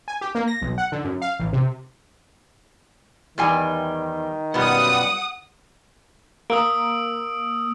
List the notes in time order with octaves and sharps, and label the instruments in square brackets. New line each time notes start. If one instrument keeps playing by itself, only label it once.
[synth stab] G#5
G4
A#3
A#6
B1
F#5
D3
F#2
F5
A1
C3
[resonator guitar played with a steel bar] E2 G3 G#5 [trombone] D#3
[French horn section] F#2 G3 F4 [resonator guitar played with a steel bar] B2 B3 [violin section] F#5 D#6
[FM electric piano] A#3 [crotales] D#6 E6 D7